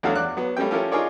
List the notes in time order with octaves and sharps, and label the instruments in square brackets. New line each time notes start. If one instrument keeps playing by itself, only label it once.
[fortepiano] E2 F#3 A3 D4 F#4 F5
E2 D5 F#6
F#3 B3
G3 A3 A#3 C#4 G5
C#4 E4 F4 G4 A4 A#4
D#4 F4 G#4 A#4 C#5 D5